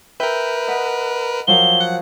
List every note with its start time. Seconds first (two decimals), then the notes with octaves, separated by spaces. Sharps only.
0.20 A#4 B4 E5 G5
0.68 D#5 F#5 B5
1.47 F3 F#3 A#4 G7
1.81 F#5